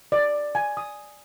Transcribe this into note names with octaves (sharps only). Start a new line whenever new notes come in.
D5
G#5
D#6